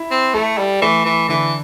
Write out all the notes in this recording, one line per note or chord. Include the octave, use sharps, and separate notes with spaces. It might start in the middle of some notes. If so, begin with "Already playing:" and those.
Already playing: E4
C4
A3 A4
G3
E3 A3
E3
D3 E3